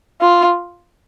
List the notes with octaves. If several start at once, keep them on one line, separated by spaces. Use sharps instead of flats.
F4